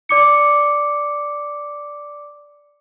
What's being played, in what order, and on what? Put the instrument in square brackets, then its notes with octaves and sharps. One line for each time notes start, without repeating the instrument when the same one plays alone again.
[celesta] D5 D6 C#7